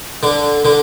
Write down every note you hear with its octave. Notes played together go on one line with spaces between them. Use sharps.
D3
D3